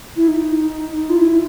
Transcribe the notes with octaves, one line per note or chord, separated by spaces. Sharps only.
E4
D#4
F4
E4